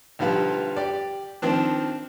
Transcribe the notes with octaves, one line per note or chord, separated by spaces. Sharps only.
B1 D3 F3 G3 B4 F5
G4 D5
D#3 F3 C4 D4